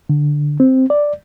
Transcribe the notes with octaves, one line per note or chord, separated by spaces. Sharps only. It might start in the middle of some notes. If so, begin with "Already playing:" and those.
D3
C4
D5